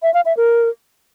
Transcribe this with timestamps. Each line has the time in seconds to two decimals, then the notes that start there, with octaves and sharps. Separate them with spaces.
0.03 E5
0.14 F5
0.25 E5
0.37 A#4